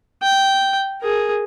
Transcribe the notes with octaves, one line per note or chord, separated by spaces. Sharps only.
G5
G#4 A#4